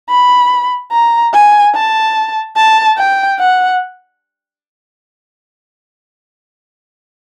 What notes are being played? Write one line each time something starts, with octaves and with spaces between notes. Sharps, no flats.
B5
A#5
G#5
A5
A5
G5
F#5